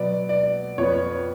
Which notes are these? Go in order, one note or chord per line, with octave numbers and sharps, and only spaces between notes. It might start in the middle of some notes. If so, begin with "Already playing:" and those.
Already playing: B2 F#3 B3 D5
D5
F2 F3 B3 C#5